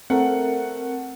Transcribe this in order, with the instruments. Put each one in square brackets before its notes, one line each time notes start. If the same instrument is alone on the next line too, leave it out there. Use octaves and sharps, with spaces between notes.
[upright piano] A3 F#5 [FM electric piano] C4 A#4